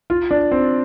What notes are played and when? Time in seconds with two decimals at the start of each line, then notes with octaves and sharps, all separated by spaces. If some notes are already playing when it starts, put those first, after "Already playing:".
0.10 F4
0.31 D4
0.51 C4